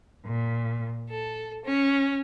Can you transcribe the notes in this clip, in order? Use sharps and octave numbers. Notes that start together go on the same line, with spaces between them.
A#2
A4
C#4